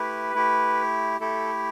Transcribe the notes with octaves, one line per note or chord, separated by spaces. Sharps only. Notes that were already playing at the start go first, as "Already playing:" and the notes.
Already playing: A3 E4 G4 B4
A3 E4 G4
A3 E4 G4 A4